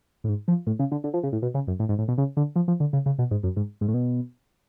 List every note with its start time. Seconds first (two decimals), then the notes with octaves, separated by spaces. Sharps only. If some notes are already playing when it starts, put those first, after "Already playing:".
0.24 A2
0.28 G#2
0.48 F3
0.67 A2
0.79 C#3
0.92 D3
1.04 D3
1.14 F3
1.23 C#3
1.32 A2
1.42 B2
1.54 C#3
1.67 F#2
1.79 A2
1.89 G#2
1.99 A2
2.08 B2
2.18 C#3
2.37 D3
2.56 F3
2.68 F3
2.80 D3
2.93 C#3
3.06 C#3
3.19 B2
3.31 G#2
3.43 F#2
3.57 G#2
3.81 G#2
3.88 A2
3.94 B2